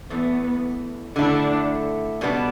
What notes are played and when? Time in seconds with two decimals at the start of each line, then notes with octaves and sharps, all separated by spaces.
0.10 E2 E3 A3 B3
1.16 D3 A3 D4 E4
2.21 B2 G3 B3 D4